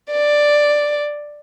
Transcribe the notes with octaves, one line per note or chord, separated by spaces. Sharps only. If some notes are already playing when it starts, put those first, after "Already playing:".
D5